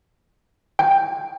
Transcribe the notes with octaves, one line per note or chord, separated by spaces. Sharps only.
G5